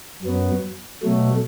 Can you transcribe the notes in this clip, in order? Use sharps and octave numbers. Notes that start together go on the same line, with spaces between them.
F#2 F#3 B3
B2 F#3 A3